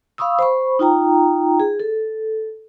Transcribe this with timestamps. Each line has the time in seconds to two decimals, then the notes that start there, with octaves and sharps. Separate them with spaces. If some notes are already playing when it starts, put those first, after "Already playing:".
0.18 F5 B5 C#6 D#6 E6
0.39 C5 B5 C#6
0.79 D#4 F4 G5 A#5
1.60 G#4
1.80 A4